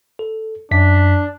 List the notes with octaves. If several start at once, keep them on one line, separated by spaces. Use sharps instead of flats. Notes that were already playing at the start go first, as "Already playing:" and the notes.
A4
F#2 D4 B6